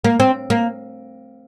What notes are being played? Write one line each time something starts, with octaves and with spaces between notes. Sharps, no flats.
A#3
C4
A#3